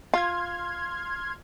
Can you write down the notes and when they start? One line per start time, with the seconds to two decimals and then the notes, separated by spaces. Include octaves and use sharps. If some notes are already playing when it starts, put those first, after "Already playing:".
0.14 F4 C6 F6 G#6